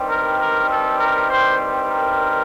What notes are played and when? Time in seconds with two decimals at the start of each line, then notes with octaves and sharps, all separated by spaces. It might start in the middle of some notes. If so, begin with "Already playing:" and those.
Already playing: G2 D#3 G3 C4
0.09 A#4
0.40 A#4
0.70 A4
0.99 A#4
1.29 C5
1.90 A#4